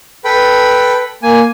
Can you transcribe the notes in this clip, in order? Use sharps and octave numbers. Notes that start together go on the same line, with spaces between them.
A4 B4 G5 B5
A#3 G#5